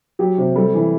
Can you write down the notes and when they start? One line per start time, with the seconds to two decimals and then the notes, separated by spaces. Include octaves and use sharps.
0.19 F#3 G4
0.38 C3
0.56 G3 A4
0.74 E3